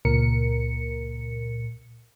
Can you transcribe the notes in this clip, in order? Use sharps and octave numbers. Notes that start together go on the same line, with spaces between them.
C#2 A#2 A#4 C#7